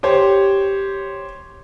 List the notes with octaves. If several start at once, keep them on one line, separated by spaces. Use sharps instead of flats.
G4 C5 C#5